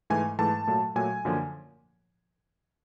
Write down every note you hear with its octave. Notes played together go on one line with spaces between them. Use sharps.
G#2 E3 A3 G#5
G#2 E3 A3 A5
A#2 F#3 A3
A#2 F#3 A3 G#5
F#2 D3 F3 A#3